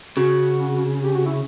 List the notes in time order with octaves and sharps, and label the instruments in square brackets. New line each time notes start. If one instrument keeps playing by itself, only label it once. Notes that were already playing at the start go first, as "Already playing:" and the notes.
[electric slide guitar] C#3 [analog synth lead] F#4
[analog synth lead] G4
F#4
E4